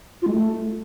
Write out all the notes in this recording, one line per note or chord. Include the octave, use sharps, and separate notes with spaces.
F4
G#3
A3